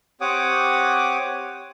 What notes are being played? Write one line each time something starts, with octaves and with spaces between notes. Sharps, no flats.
C4 G4 C#5 F#5 D6 D#6